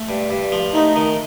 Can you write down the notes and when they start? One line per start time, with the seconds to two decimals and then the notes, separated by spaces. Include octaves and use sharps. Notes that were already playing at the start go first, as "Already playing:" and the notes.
Already playing: A3
0.09 G2
0.31 G2
0.52 F3
0.74 A3 D#4
0.96 D#3